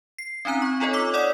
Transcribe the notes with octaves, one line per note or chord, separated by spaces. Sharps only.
C7
C4 C#4 D#4 A#5 F#6
C#6
D#4 F4 A4 C#5 D#5
D6 E6 B6
C#5 D5 F#5 D#6 E7